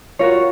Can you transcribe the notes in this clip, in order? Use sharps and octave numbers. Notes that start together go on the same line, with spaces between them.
F4 F#4 A#4 C#5